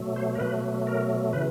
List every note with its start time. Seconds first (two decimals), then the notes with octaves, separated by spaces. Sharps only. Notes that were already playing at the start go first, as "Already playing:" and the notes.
Already playing: B2 F#3 A3
0.16 C5
0.35 A#4
0.40 B2 F#3 A3 B4
0.87 A#4
1.33 C#3 E3 B4